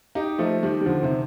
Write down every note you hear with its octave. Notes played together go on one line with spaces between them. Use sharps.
D#4 G4
F3 A3
D#3 G3
G3
D3 F3
C3 D#3